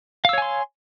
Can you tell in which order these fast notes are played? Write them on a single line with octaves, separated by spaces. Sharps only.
F5 E6 C#5 G#5 C6